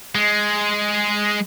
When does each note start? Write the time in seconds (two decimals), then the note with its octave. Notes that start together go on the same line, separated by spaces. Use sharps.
0.15 G#3